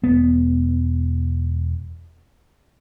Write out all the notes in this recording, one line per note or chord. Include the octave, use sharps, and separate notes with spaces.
E1 B3